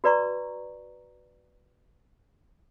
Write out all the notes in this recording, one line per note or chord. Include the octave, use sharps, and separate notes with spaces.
F#4 B4 D5 A#5 C#6